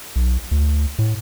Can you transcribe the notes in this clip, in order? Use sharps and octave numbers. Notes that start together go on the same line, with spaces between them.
B1
D2
A2